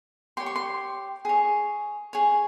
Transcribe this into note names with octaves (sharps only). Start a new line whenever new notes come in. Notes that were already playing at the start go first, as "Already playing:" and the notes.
G4 C#5 C6
C#6
C6
G#4 C#5
G#4 C#5